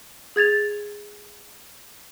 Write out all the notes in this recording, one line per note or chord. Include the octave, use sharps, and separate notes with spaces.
G#4 G#6 A6 F7